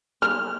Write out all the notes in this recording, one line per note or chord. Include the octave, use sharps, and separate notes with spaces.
F6